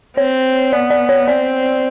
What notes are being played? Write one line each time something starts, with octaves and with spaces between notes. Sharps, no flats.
C4 C#5
B3 D5
D5
C#5
C4 D5